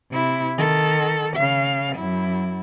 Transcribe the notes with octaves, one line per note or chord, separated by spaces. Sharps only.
C3 E4
D#3 A4
C#3 F5
F#2 E4